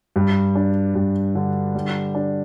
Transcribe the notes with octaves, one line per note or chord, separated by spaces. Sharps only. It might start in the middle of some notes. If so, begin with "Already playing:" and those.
G2
D4
G2
D3
G3
D4